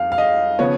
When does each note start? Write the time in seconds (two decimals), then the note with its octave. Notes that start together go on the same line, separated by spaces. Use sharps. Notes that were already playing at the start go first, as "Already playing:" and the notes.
Already playing: F2 F5
0.12 F5
0.18 D#5
0.59 C#3 F3 B3 C#5